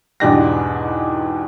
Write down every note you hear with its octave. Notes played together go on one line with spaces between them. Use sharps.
E2 G#2 B2 D4 G4 A#6